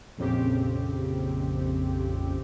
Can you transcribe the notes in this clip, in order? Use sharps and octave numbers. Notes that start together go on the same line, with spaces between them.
A#1 F2 C#3 C4 G4